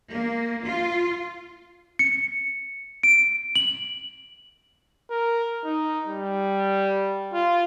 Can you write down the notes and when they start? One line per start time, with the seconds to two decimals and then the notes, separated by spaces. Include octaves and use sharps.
0.11 A#3
0.63 F4
1.99 C#7
3.03 D7
3.56 F#7
5.10 A#4
5.64 D#4
6.07 G3
7.33 F4